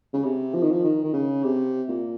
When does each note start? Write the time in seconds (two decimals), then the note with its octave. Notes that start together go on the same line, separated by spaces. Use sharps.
0.13 C#3
0.24 C3
0.54 F3
0.63 D#3
0.72 F3
0.84 D#3
1.04 D#3
1.14 C#3
1.44 C3
1.89 A#2